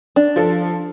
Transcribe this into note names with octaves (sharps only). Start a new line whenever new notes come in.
D4
F3 A4